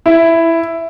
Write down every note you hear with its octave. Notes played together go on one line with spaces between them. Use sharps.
E4